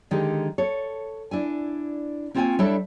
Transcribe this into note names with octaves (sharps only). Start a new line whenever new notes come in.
D3 D#3 G#3 D#4 G4
A4 C#5
D4 E4 G#5
A#3 C4 F4 F#4 G5 G#5
G3 D4 E4 A4 C#5 E5